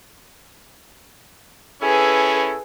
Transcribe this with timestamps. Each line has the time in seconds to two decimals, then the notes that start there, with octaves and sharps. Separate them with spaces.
1.82 C#4 E4 G#4 A4 B4